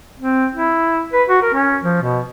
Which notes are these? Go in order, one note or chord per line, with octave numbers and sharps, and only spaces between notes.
C4
E4
B4
F#4
A#4
C#4
F3
B2